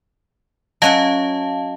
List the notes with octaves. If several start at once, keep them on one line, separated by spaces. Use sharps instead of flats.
F#3 C#4 D#5 F5 F#5 A5